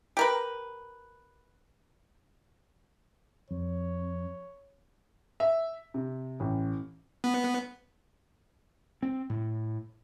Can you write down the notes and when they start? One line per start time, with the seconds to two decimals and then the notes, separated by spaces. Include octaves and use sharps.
0.17 G4 A#4 B4
3.51 F2 C#5
5.40 E5
5.94 C3
6.40 A1
7.24 B3
9.02 C4
9.30 A2